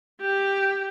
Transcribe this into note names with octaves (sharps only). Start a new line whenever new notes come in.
G4